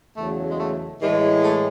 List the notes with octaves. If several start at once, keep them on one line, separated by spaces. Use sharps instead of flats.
E2 C#3 F#3 A3
G#3
A3
A2 E3 G#3
A3